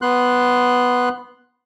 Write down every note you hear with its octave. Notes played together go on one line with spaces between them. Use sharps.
B3 C6 F#6